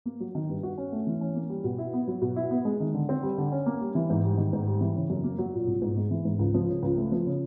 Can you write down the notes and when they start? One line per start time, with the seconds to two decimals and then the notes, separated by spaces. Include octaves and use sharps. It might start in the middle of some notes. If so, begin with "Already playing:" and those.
0.06 A#3
0.20 F#3
0.35 D#3
0.49 G2
0.63 F#4
0.78 C#4
0.92 A3
1.07 E3
1.21 C#4
1.35 A#3
1.50 G3
1.64 B2
1.78 E4
1.93 B3
2.08 F#3
2.22 B2
2.36 E4
2.51 B3
2.65 G#3
2.80 D#3
2.94 D3
3.09 C4
3.23 G3
3.38 D3
3.52 C#4
3.66 A#3
3.81 G3
3.95 E3
4.10 G#2
4.24 G3
4.37 D#3
4.53 G#2
4.67 G3
4.81 E3
4.96 C#3
5.10 F#2
5.24 A#3
5.38 F#3
5.54 A#2
5.67 C2
5.82 G#2
5.97 G#3
6.11 E3
6.25 G#2
6.39 C#2
6.54 F3
6.69 C#3
6.83 C#2
6.97 A3
7.12 F3
7.26 C#3